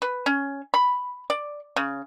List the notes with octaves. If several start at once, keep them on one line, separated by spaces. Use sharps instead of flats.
B4
C#4
B5
D5
C#3